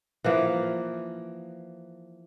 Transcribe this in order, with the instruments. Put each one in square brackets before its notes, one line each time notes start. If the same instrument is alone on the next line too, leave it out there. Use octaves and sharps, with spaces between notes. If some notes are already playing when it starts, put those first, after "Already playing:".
[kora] E3 F3 A#3